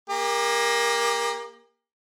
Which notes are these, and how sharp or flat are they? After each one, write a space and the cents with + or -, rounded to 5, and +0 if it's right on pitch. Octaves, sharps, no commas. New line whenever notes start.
A#3 +15 G4 +40